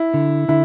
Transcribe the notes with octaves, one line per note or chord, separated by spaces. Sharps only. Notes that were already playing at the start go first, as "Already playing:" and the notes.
Already playing: E4
D3
D3 E4